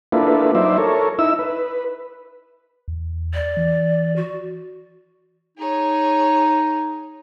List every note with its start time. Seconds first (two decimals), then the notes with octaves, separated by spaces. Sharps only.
0.12 A#3 D4 E4 F4 A4 B4
0.55 F#3 D#4 C5 D5 E5
0.78 A4 A#4 C#5
1.19 D#4 E4 E6
1.39 B4
2.88 E2
3.34 D5
3.57 E3
4.16 F#4
5.58 D#4 G#4 C#5